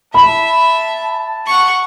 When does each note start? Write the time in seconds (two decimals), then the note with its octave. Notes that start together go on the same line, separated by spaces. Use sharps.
0.14 E5 A5 B5
1.12 A5
1.47 F#5 C#6